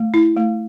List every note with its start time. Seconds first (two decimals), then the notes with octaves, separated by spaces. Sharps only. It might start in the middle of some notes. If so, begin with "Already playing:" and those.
Already playing: A3
0.14 E4
0.36 A3